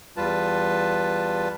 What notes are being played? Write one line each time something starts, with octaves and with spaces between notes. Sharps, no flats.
E2 G3 F4 B4 A5